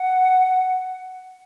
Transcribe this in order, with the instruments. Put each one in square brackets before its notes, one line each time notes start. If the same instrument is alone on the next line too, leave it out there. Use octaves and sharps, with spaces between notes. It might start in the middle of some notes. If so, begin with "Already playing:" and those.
Already playing: [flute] F#5